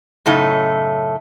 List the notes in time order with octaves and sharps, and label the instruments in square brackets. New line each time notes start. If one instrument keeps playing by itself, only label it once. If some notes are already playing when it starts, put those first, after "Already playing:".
[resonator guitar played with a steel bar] F#2 A2 C#3 A3 D#4